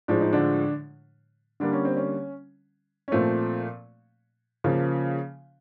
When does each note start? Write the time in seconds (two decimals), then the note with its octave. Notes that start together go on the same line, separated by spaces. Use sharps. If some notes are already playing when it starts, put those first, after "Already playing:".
0.08 A2 F3 G#3 D4
0.21 D#4
0.33 D3 D4
1.60 D3 G3 A#3 D4
1.73 C#4
1.85 C4
1.96 C#4
3.08 C#4
3.12 A#2 F3 A3 C4
4.64 C#3 F3 A#3